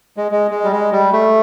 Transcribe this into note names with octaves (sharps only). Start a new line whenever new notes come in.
G#3
G#3
G#3
G3
G#3
G3
A3